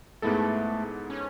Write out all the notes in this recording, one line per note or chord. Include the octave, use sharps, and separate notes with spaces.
G#2 G#3 A3 B3 E4 A4
C#4